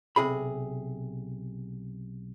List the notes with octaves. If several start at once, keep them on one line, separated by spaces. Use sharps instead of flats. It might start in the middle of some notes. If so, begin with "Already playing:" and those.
B1 C3 G#4 B5